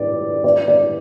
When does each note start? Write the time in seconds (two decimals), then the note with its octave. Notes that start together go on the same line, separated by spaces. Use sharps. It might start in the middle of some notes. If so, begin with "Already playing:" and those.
Already playing: D5
0.44 D5
0.68 D5